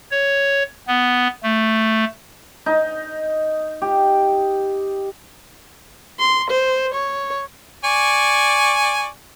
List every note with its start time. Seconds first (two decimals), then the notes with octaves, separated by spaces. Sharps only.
0.11 C#5
0.87 B3
1.43 A3
2.66 D#4
3.82 G4
6.19 C6
6.50 C5
6.94 C#5
7.84 D5 G#5 C#6